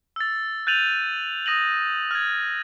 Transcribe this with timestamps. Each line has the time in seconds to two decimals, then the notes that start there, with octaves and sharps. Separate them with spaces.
0.16 E6 A6
0.67 F#6 G6 A6 D#7 F7 F#7
1.46 D#6 A#6 D#7 F#7
2.11 F6 G#6